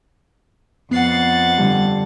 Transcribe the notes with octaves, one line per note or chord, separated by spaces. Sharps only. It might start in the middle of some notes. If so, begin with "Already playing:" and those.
F2 B3 F#5 A6 C7
G2 D3